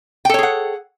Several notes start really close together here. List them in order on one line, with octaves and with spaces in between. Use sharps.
G5 A4 C#5 G#4 F#5